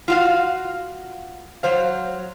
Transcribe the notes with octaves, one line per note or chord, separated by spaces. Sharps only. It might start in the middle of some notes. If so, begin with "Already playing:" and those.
F4 F#4 F5
F#3 C5 F5